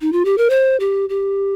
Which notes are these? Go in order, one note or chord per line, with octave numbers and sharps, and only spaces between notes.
D#4
F4
G4
A#4
C5
G4
G4